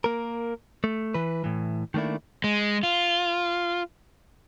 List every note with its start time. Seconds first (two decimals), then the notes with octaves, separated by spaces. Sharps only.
0.04 A#3 A#4
0.84 A3
1.14 E3 B4
1.44 A2 E3
1.94 D#3 A3 A#3 D4 E4
2.44 G#3
2.83 F4